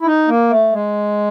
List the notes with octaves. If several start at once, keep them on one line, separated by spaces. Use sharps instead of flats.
E4
D#4
A#3
A3
G#3